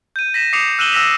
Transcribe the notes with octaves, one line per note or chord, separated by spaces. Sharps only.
G6 D#7
A#6 B6 E7
D6 D#6 C7 C#7 E7 F7
E6 F#6 D#7 E7 F#7 G7
E6 F#6 A#6 B6 E7 F7